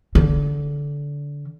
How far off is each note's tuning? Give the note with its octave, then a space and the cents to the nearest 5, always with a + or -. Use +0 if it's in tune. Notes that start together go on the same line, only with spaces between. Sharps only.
D3 -20